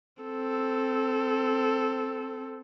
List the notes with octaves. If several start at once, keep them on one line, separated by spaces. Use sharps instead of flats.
C4 A4